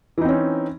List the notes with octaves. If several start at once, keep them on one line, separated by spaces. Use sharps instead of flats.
E3 C4 C#4 D#4